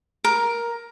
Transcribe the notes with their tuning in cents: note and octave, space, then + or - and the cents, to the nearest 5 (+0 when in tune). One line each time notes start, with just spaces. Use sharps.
A#4 +10